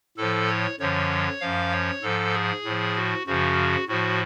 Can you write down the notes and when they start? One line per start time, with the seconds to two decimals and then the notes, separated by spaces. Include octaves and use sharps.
0.17 A2 F3 A4
0.48 C#5
0.80 F#2 D3 F3 C#5
1.41 F#2 F3 F5
1.71 C#5
2.02 G#2 F3 A4
2.33 G#4
2.64 A2 F3
2.95 F#4
3.27 F#2 C#3 F3 F#4
3.88 A2 F3 F#4